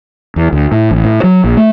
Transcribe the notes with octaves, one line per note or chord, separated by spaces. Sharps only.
E2
D2
A2
A1
A2
F#3
A#1
A3